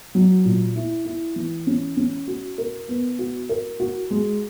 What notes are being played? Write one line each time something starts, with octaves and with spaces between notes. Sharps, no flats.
F#3
A#2
E4
E4
E3
C#4
C#4
F#4
A#4
B3
F#4
A#4
F#4
G#3